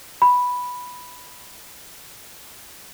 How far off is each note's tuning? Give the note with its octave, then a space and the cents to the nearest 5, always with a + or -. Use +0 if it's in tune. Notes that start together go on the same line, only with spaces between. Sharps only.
B5 -5